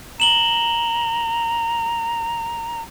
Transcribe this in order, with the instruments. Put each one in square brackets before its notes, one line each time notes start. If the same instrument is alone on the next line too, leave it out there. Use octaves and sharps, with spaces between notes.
[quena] A#5 [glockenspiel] E7 F#7 G7